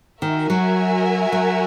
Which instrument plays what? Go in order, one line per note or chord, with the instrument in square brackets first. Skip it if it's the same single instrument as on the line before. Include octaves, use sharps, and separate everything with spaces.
[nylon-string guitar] D#3 [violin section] F#4 A#4 E5 G#5
[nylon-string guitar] F#3
F#3